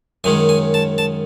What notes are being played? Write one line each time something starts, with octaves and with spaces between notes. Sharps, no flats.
F#2 D#3 G#3 C#4 G#5
G#5
A5
A5